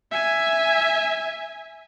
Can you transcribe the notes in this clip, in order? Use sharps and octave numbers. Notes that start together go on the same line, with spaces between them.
E5 G#5